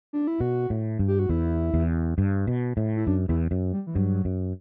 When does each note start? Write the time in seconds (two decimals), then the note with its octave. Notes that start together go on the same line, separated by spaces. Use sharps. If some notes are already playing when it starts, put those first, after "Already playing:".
0.13 D4
0.27 E4
0.40 B2 F#4
0.70 A2
0.99 G2
1.08 G4
1.19 F#4
1.29 E2 E4
1.74 E2
2.18 G2
2.47 B2
2.77 A2
2.97 E4
3.07 F#2 D4
3.28 E2 E4
3.51 F#2
3.73 G3
3.87 E3
3.95 G2 F#3
4.25 F#2